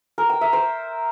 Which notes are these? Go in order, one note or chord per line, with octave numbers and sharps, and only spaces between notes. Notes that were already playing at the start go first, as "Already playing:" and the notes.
A#4
G5
E5
C5